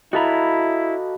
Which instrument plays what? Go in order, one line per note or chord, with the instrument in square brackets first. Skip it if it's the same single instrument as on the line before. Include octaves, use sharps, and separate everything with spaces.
[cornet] E4 [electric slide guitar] F#4 A4 A#5 [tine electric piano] D#5 F5 B5